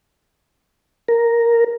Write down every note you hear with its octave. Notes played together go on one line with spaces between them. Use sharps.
A#4